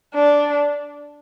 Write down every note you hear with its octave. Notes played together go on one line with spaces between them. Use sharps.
D4